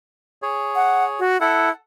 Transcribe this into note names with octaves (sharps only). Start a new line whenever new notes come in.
G#4 C#5
F#5
F#4
E4 A4 F#5